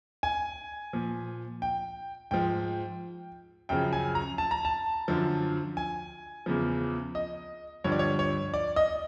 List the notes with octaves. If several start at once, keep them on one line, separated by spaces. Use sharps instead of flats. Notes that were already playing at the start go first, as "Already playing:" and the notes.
G#5
A#2 F3
G5
G#2 F3 G5
F#2 C#3 F3 G5
G#5
A#5
A5
A#5
A5
F#2 D3 F3
G#5
E2 C#3 F3
D#5
G2 D3 F3 C#5
D5
C#5
C#5
D5
D#5